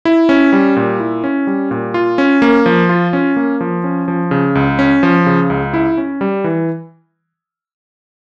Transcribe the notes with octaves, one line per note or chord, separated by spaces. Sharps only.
E4
C#4
G3
A#2
E4
C#4
G3
A#2
F4
C#4
A#3
F3
F4
C#4
A#3
F3
C#4
F3
C#3
C#2
C#4
F3
C#3
C#2
E4
C#4
G3
E3